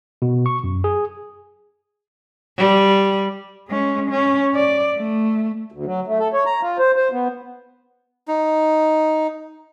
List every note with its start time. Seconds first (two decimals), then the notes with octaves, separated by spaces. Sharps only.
0.22 B2
0.46 C#6
0.64 F#2
0.84 G#4
2.57 G3
3.68 G#3 C#4
4.10 C#4
4.55 D5
4.96 A3
5.72 D2
5.86 F#3
6.07 A3
6.19 A4
6.33 C#5
6.46 A#5
6.61 F4
6.79 C5
6.96 C5
7.12 B3
8.28 D#4